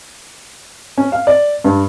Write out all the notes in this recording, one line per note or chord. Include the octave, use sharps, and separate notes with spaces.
C#4
F5
D5
G2